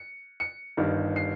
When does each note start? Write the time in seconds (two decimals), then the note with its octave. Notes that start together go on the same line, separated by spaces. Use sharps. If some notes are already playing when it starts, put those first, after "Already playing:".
Already playing: C#7
0.40 C#7
0.77 G1 G2 D#3
1.16 C7